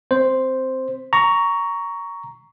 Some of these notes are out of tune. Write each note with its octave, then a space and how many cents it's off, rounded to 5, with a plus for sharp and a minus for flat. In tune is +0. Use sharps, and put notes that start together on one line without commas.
C4 -5 C5 +0
A#5 +0 C#6 +15